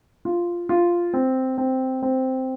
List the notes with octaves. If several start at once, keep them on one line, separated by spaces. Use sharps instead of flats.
F4
F4
C4
C4
C4